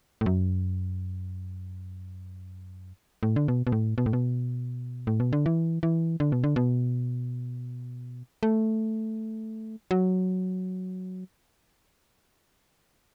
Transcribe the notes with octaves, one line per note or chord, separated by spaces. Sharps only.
A2
F#2
A2
D3
B2
B2
A2
B2
A2
B2
A2
B2
D3
E3
E3
D3
B2
D3
B2
A3
F#3